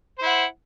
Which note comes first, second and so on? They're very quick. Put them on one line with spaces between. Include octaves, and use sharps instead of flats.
C5 E4 F#5